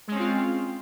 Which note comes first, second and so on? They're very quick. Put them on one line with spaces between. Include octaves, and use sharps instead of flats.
G#3 C#4 C4 F4